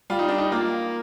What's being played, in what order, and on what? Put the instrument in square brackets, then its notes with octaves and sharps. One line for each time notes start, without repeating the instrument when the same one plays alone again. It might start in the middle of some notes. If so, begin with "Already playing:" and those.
[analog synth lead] G3 [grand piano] F4
[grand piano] D#4
D4
D#4
[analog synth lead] A#3 [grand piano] F4